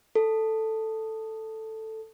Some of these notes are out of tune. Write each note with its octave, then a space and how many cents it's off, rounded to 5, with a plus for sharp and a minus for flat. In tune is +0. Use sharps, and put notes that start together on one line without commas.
A4 +5